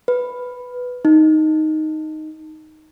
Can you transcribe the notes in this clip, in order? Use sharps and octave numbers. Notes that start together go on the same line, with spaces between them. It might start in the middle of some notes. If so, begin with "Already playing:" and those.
B4
D#4